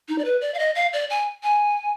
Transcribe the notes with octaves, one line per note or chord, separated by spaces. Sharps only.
D#4
D5
B4
D5
F5
D#5
F5
D5
G#5
G#5